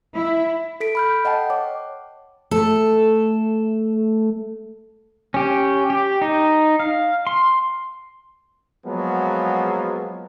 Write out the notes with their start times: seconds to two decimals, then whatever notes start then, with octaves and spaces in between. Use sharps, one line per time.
0.15 E4
0.80 A4 B6 D7
0.95 B5 F6 G6
1.25 D#5 F#5 G5 A5
1.50 C#5 D6
2.51 A3 A4
5.34 C#4 G4
5.90 G4
6.22 D#4
6.80 F5
7.27 C6
8.86 F3 F#3 G#3 A#3 B3